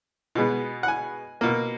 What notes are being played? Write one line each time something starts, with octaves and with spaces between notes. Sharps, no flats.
B2 G#3 B3
F#5
G#5
B2 A#3